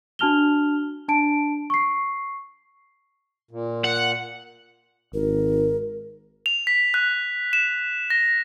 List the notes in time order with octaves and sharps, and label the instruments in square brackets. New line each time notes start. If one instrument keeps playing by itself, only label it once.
[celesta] D4 F#4 A5 F6 F7 G7
D4 A5 D7
C#6 C7
[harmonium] A#2
[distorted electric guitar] F#5
[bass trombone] G#1 [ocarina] A#4
[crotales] F7
B6
F#6
E7
A#6